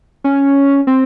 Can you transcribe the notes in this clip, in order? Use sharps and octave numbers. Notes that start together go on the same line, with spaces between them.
C#4
C4